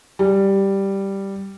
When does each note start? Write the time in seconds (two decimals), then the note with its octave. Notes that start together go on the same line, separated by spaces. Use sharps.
0.19 G3